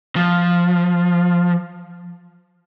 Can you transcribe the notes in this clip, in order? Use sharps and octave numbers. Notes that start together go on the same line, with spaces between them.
F3